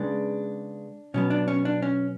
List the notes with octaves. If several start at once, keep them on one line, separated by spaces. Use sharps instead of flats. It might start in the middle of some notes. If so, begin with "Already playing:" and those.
Already playing: C#3 G#3 B3 D4
B2 F#3 B3 C#4
D4
C#4
D4
C#4